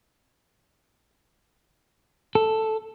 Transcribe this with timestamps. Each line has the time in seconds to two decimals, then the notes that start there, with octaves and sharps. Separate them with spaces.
2.35 A4